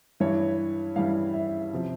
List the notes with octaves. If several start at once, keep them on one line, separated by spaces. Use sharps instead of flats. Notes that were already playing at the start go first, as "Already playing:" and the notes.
G2 E3 G3 C#5
G2 E3 G3 F5
E5
C3 F3